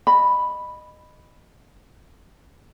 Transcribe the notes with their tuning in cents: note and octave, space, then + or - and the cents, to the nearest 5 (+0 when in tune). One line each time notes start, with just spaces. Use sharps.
D#5 -20 B5 +0